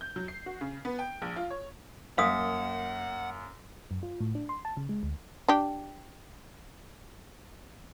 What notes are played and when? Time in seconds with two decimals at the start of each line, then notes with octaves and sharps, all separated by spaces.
0.01 G6
0.16 F#3
0.28 C7
0.46 F#4
0.61 C#3
0.85 B3
0.99 G5
1.22 A#1
1.36 F4
1.50 C#5
2.18 F#2 A#3 F5 F#5 D#6
3.91 F#2
4.03 F4
4.21 A2
4.35 D4
4.49 C6
4.65 A5
4.77 C#3
4.89 G#3
5.03 D2
5.48 D4 G4